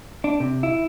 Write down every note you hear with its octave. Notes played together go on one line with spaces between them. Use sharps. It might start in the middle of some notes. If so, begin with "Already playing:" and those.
D4
C3
E4